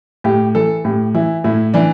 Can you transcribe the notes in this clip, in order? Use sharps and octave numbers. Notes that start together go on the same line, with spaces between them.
A2 G4
E3 A4
A2 G4
E3 E4
A2 E4
E3 D4